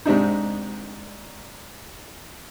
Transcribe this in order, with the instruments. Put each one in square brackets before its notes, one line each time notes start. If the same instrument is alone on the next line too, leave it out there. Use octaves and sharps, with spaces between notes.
[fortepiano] G#2 C3 D4 D#4